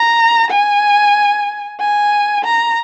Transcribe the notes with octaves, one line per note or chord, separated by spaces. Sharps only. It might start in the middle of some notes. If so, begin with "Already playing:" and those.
Already playing: A#5
G#5
G#5
A#5